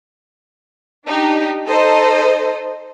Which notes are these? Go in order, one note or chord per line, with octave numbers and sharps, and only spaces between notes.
D4 D#4 G4
D#4 A4 C5 D#5